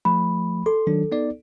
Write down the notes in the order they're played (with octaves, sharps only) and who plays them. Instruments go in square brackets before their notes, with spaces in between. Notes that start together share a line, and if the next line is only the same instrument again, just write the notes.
[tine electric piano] F3 A3 [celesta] B5
[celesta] A4 [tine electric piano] C6
[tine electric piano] D#3 F#3 D4
B3 D#4 D5